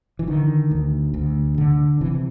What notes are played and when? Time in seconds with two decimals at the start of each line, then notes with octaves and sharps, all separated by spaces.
0.19 E3
0.27 D3 D#3
0.71 D2
1.14 D2
1.58 D3
2.01 C3 E3